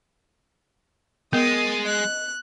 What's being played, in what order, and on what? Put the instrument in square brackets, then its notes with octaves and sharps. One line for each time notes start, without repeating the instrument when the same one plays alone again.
[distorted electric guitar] G#3 [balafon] B3 [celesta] A#4 D#5 F#5 [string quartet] D#6 A6
[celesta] D#5 [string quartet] F#6